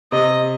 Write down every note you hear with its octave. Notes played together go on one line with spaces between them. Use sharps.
C3 D#5